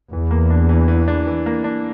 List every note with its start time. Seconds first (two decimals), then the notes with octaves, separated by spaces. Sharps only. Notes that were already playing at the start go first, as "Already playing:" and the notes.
0.12 E2 E3
0.31 A#3
0.50 D4
0.69 E3
0.88 E3
1.08 D4
1.27 E3
1.46 A#3
1.64 D4